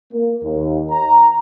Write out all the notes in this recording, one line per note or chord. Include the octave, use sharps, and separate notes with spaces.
A#3
D#2
A#5